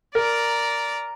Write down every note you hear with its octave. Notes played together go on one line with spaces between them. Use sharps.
A#4 D5 A#5